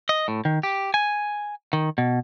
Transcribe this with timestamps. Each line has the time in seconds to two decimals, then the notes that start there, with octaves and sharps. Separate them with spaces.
0.09 D#5
0.28 A2
0.45 D#3
0.63 G4
0.94 G#5
1.73 D#3
1.98 B2